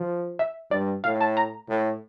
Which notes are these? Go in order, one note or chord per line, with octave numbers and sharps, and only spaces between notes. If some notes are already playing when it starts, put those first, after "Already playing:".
Already playing: F3
E5
G2 D5
A2 F5
A5
A#5
A2